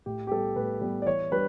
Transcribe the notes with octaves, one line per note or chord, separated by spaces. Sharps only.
A2 G4
G4
G3 B3 A4
A2 B4
G3 B3
D5
E3 C#5
G3 D4 B4